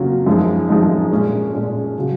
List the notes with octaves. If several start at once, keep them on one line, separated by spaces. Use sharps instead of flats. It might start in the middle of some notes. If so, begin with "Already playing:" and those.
Already playing: C#3 F#3 A#3 C#4 F4
F#2 F3 G#3 D#4
F#2 F3 G#3 D#4
A#2 G#3 C#4 G#4
A#2 G#3 C#4 G#4
C#3 F#3